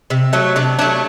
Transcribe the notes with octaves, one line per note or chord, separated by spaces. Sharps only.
C3
F#3 A3
C3 D4
F#3 A3 D4